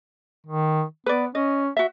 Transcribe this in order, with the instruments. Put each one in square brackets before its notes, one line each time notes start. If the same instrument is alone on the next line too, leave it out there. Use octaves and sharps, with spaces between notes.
[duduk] D#3
[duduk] B3 [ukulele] B4 D5
[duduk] C#4 [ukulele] D#5
[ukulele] F#4 E5